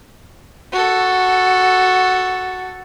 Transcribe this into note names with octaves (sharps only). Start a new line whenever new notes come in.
F#4 A4